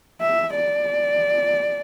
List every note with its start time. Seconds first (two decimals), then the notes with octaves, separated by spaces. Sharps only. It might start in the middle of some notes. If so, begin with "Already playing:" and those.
0.21 E5
0.55 D5